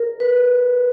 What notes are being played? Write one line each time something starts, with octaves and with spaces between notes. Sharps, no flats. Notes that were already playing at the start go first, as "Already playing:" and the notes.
Already playing: A#4
B4